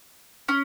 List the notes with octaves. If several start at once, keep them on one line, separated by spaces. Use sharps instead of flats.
C#4